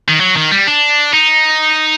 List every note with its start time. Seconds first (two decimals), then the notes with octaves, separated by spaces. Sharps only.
0.08 D#3
0.20 F#3
0.36 D#3
0.51 G3
0.67 D4
1.14 D#4